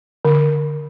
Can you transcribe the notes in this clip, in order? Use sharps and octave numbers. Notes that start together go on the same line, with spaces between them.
D3